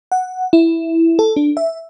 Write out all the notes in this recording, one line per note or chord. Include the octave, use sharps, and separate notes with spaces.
F#5
E4
A4
D4
E5